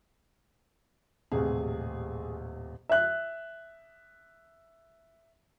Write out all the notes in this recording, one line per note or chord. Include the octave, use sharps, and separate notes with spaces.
D#1 A1 C3 G#4
E5 F#6